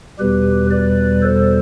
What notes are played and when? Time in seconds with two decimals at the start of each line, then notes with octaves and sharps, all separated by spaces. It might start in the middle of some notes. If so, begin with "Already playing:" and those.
0.19 E2 B2 G3 G4 B4
0.70 B4 D5
1.22 A4 C5